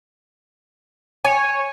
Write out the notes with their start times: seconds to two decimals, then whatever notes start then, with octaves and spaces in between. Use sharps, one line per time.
1.25 C#5 G#5